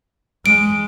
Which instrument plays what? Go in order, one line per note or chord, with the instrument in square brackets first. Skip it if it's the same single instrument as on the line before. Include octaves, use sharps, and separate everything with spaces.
[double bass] G#3 [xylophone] D7